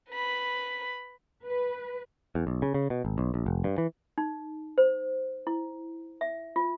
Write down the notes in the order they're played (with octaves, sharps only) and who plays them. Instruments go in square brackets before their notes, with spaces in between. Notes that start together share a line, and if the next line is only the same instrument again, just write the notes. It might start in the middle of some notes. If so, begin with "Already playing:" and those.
[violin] B4 B5
[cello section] B4
[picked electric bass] E2
B1
C#3
C#3
B2
G#1
B1
A#1
F1
G2
E3
[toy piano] D#4
C5
E4
E5
F4